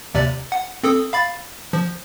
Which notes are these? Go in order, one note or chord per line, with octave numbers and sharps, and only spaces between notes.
D#2 C3 D5
F#5
C4 A4 D#6
F5 B5 A6
F3